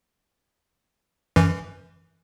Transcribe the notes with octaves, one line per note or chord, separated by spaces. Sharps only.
F#2 E3